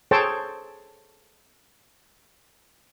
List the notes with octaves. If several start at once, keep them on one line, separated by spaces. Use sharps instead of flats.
G#4 A4 C5 C#5 G5 A5